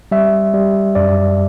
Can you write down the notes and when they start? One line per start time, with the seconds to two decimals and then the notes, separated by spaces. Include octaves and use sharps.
0.12 G3 E5
0.54 G3
0.95 F#2 D5